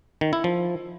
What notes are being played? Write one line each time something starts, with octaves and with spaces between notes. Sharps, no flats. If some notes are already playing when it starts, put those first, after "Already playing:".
D#3
E4
F3